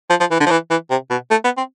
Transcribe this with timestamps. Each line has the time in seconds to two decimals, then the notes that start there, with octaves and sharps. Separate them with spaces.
0.10 F3
0.20 F3
0.31 E3
0.40 D3
0.46 F3
0.51 E3
0.70 E3
0.90 C3
1.10 B2
1.31 A3
1.44 B3
1.57 C4